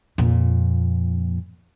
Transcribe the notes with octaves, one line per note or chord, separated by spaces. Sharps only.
F2 A#2